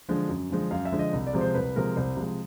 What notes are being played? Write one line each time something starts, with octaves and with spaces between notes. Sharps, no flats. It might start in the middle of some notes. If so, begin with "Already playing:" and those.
D3 F3 G#3
F#2
D3 F3 G#3
F#2 F5
E5
D3 F3 G#3
D#5
C2
D5
C3 F3 G#3
C5
C2 B4
C3 F3 G#3 A#4
C2 C5
C3 F3 G#3